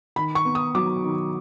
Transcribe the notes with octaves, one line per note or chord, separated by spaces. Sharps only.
D#3 B5
C#6
B3
D#6
F#3 D6
D#3